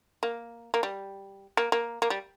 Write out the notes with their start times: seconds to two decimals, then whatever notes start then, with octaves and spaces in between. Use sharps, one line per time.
0.23 A#3
0.74 A#3
0.83 G3
1.57 A#3
1.72 A#3
2.02 A#3
2.10 G3